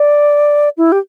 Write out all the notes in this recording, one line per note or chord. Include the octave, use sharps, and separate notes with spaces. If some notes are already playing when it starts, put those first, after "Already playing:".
Already playing: D5
E4
G4